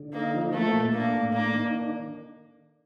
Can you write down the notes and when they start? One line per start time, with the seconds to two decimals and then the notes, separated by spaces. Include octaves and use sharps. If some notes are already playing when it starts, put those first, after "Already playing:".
Already playing: D3
0.13 A#3 D#4
0.34 F3
0.53 A3 A#3
0.73 A#2
0.93 A#3 D4
1.13 A2
1.33 A#3 D4
1.53 D#3
1.74 D4